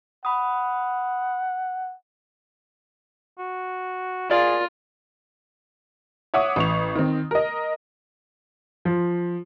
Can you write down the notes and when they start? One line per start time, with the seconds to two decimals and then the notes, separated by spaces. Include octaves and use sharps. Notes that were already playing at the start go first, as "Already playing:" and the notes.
0.25 F#5 B5 D#6
3.39 F#4
4.31 F4 G#4 A#4 D5
6.34 C#5 E5 F#5 D6 D#6
6.56 A1 C#6 F7
6.95 D#3 C4
7.31 A#4 D#5
8.85 F3